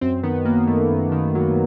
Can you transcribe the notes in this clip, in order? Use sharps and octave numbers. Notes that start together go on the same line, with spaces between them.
F#2 C4
D#3 B3
F#2 A#3
F#2 A3
F#2
D#3
F#3